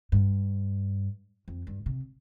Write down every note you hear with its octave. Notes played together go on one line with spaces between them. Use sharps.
G2
F2
G2
C3